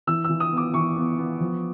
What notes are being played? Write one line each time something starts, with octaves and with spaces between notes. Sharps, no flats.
E3 E6
E3 E6
D#6
B3
D6
E3 C#6
B3
B3
F3